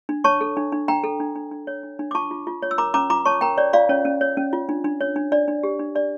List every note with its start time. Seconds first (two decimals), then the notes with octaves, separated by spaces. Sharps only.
0.09 D4
0.24 C#5 A5 C#6
0.41 A4
0.57 D4
0.72 D4
0.88 D4 G5 A#5
1.04 A4
1.20 D4
1.35 D4
1.52 D4
1.67 C#5
1.83 D4
1.99 D4
2.11 D6
2.15 F4 A5 C#6
2.31 F4
2.47 F4
2.62 C#5
2.71 E6
2.78 A#4 A#5 D6
2.94 C#4 A#5 D6
3.10 F4 A#5 D6
3.25 C#5 A5 C#6
3.41 A#4 G5 A#5
3.57 C#5 D5
3.73 F4 D5 F5
3.89 C#4 C#5
4.05 C#4
4.21 C#5
4.37 C#4
4.53 F4
4.69 D4
4.84 D4
5.01 C#5
5.16 D4
5.32 D4 D5
5.48 D4
5.63 G4
5.79 D4
5.95 D4 D5